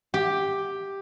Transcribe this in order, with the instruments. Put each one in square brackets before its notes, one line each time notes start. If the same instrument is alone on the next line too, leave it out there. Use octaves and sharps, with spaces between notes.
[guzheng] G4